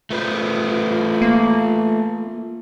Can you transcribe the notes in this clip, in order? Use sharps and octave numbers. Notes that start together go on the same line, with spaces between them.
A3 F4 B4 C5
A#3